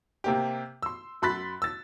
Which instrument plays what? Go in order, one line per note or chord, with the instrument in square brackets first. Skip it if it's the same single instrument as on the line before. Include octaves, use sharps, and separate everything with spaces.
[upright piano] C3 A#3 G4
C6 E6
F#2 B5 C6 F#6 A6 B6
E6 A6